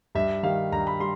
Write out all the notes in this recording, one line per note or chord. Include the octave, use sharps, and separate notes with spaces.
G2 E5
D#3 G3 F5
G2 A#5
B5
G3 C6